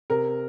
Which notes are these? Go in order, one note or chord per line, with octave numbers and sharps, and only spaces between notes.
C3 A#4